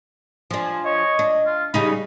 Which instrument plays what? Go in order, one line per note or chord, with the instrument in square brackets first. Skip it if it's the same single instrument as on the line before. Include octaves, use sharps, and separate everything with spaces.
[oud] F3 D4 [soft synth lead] G#5
[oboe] C#5 [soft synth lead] D#5
[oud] D4
[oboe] F4
[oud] C#3 D#4 [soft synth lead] G3 [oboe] B5